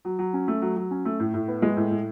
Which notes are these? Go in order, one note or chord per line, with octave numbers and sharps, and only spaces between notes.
F#3
F#3
C#4
A3
F#3
F#3
C#4
A3
A2
A2
B3
G#3
A2
A2